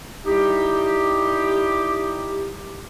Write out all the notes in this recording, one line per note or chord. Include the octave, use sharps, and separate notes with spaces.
G3 D#4 E4 G4